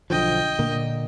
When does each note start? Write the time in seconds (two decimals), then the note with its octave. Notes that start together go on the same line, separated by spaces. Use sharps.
0.10 B1 D3 F3 D#5 G5
0.59 A#2 D3 A#3